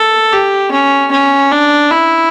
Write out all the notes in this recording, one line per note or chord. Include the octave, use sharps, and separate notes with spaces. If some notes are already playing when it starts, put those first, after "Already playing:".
Already playing: A4
G4
C#4
C#4
D4
E4